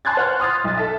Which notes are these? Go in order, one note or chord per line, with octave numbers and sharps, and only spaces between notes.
G#5 A5 C6 F#6 G#6 A6
C5 C#5 F#5 F6
C6 D#6 F6 A6
B1 A6
A4 E5